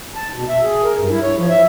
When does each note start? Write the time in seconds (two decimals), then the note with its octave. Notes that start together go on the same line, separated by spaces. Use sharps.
0.15 A5
0.35 B2
0.49 E5
0.63 G#4
0.84 A#4
0.98 G2
1.11 E4
1.22 C#5
1.38 F3
1.49 E5